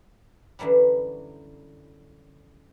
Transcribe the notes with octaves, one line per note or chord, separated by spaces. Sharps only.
F#2 D3 E3 F#3 G3